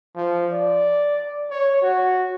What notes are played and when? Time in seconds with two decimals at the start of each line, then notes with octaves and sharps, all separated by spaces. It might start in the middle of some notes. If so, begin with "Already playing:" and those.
0.16 F3
0.52 D5
1.50 C#5
1.82 F#4